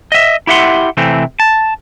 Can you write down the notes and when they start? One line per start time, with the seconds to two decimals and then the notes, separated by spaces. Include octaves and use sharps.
0.12 D#5 E5
0.47 E4 G4 E5 F#5 C6
0.97 C3 E3 A3 C4
1.40 A5